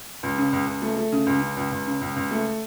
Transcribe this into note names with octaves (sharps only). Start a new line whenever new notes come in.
C#2
C#3
C#2
C#2
A3
A3
C#3
C#2
C#3
C#2
C#2
C#3
C#2
C#2
A3